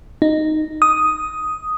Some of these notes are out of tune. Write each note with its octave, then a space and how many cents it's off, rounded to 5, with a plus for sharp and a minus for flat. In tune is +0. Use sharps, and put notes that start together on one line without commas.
D#4 -5
D#6 +5